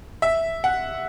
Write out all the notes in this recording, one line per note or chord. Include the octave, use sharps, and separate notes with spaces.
E5
F#5